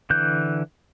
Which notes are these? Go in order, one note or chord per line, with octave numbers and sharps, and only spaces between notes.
D3 E3 F#6 G6